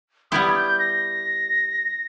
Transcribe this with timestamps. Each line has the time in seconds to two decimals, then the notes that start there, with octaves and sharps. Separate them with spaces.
0.31 G3 B3 E4 G4 D#6
0.49 G#6
0.55 G6
0.79 A#6